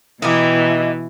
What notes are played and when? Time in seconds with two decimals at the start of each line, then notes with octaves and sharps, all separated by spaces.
0.22 B2 E3 D#4 E4 G4